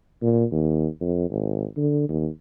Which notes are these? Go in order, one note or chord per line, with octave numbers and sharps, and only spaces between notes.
A#2
D#2
F2
G#1
D3
D#2